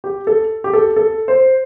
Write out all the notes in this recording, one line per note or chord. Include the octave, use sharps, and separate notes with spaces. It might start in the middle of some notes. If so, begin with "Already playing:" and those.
G4
A4
G4
A4
A4
C5